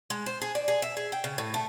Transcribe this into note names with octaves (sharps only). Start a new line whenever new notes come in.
G#3
C5
G#4
D5
G#4
E5
G#4
G5
C#3
A2
A3